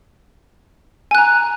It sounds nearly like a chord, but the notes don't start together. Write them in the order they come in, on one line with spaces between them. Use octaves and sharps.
G#5 F#6 A#5